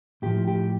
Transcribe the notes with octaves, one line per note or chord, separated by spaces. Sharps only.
A2 F3 G4
G4